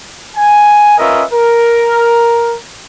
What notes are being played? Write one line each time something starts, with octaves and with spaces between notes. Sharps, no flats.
G#5
C#4 F4 A#4 B4 D#5 E5
A#4